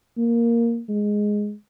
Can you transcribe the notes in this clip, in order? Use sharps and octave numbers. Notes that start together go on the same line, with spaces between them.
A#3
G#3